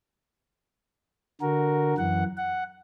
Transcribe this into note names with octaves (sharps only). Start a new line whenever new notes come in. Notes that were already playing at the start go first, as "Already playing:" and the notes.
D3 F#4 A#4
F#2 E3 F#5
F#5